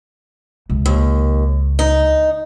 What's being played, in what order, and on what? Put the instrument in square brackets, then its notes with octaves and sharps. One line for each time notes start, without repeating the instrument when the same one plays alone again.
[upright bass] C#2
[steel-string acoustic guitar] D#2
D#4